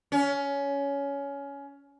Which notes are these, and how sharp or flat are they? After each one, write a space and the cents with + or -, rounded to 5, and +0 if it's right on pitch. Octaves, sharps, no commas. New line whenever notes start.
C#4 +20